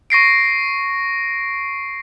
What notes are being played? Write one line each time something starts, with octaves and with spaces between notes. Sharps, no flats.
C#6 A#6 C7 D7